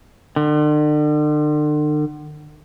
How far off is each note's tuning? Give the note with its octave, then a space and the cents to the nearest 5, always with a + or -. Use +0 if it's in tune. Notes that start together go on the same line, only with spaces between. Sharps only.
D3 +40